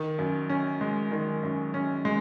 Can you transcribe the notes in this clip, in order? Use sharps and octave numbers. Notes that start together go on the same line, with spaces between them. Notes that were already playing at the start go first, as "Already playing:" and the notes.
Already playing: D#3
F#2
C#4
G#3
D#3
F#2
C#4
G#3